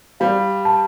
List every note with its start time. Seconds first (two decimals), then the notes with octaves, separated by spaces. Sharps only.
0.20 G3 F5
0.65 A5